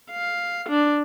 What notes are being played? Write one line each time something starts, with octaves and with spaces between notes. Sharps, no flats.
F5
D4